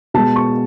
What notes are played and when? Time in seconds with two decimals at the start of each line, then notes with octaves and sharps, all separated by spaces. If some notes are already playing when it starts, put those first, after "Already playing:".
0.14 B2 G#3 A5
0.36 C#6